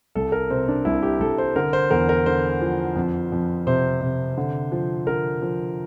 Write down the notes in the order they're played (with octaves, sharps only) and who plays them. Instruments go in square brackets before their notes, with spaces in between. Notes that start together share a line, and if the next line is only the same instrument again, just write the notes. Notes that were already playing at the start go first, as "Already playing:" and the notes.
[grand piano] C2 A4
A#4
C3 C4
D4
C2 E4
G4
C2 A4
C5
D3 A#4
C5
E2 A#4
A#4
D3 C5
F3
F2
F2
C3 C5
C3
D3
F3
D3 A#4
F3